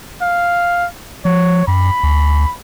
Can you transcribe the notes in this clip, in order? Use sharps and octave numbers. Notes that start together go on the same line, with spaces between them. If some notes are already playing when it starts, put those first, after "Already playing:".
F5
F3 C#5
F#2 B5
D2